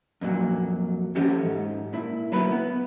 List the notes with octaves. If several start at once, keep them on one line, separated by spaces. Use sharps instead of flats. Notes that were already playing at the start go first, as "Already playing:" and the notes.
F2 A#2 F#3
E3 F3 C#4 F#4 G4 A4
G#2
A#2 E4
F#3 A#3 B3 E4 B4
B3